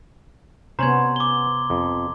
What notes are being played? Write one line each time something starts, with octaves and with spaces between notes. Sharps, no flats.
C3 B3 C#4 C5 A#5 C6 G#6
D6 G7
F2